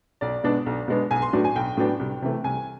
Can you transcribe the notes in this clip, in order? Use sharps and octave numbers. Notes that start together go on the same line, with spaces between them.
B1 D5
B2 G#3 B3 D4
B1
B2 G#3 B3 D4
B1 G#5
C6
A2 F#3 B3 D4
G#5
B1 G5
A2 F#3 B3 D4
C2
C3 E3 A3
C2 G#5